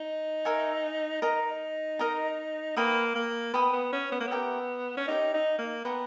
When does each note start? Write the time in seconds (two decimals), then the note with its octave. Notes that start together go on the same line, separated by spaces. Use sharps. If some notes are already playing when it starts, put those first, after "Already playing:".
Already playing: D#4
0.45 A#4 E5 G#5 C#6
1.22 D#4 A#4 D#5 A#5
1.99 A#4 D#5 A#5
2.76 A#3 B4 G5 B5 D#6
3.16 A#3
3.54 B3 B4 G5 B5 D#6
3.73 B3
3.93 C#4
4.12 B3
4.21 A#3
4.28 B3 G4 A#4 E5 G5
4.97 C#4
5.08 D#4 G4 A#4 E5 G5
5.34 D#4
5.59 A#3
5.85 B3 B4 G5 A#5 C#6